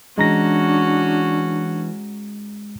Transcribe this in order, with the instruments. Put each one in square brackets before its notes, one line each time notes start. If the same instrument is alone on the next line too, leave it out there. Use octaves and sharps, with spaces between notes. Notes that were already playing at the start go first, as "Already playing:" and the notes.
[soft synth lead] E3 [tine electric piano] G#3 A#5 A#6 [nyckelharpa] C#4 F#4 [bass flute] D4